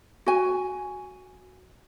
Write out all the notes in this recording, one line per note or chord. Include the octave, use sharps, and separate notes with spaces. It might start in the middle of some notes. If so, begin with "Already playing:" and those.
F#4 G#5